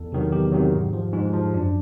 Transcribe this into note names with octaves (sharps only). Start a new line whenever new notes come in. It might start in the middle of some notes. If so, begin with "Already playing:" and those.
Already playing: E2 A4
C3 D#3 F#3
E2 G4
C3 D#3 F#3
G#2
F3
G#2 F4
F3
F#2 D4